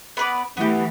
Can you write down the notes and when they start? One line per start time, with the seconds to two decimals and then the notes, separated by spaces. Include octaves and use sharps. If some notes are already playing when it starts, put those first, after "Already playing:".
0.17 B3 B4 D5
0.57 E3 A3 B3 G4